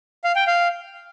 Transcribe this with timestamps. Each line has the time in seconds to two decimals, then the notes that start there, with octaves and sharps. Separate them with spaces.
0.24 F5
0.36 G5
0.47 F5